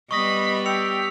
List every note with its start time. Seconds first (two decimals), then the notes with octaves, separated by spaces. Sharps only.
0.11 G3 B3 D#5 B5 C#6 D#6 A#6
0.66 G4 G5 E6 B6 C#7 F7